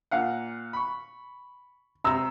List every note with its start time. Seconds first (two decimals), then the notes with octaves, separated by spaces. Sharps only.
0.11 A#2 F5 F#5
0.73 B5 C#6
2.04 C3 A#5 E6